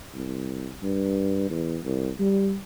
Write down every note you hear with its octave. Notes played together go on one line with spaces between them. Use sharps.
C2
G2
E2
C2
G3